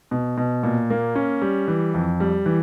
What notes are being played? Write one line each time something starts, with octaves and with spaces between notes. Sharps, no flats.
B2
B2
A#2
A#3
C#4
G3
E3
F2
G3
E3